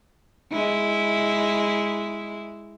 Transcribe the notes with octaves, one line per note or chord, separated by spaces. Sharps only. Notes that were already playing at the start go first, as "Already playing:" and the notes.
G#3 E4